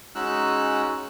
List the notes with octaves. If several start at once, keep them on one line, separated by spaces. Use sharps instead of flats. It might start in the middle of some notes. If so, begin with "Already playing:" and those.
G#3 C#4 D#4 F#4 E6 F#6